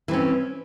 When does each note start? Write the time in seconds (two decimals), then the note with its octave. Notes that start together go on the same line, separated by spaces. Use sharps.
0.08 E3
0.11 C4
0.13 C#4